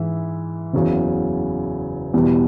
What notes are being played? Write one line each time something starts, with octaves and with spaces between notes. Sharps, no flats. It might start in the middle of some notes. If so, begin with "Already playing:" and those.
Already playing: G#2 E3 E5
F#1 E2 C#3 F#3
E2 B2 G3